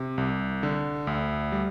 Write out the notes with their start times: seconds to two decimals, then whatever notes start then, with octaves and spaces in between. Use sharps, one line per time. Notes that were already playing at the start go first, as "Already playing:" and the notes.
Already playing: C3
0.18 C2
0.63 D3
1.07 D2
1.52 G3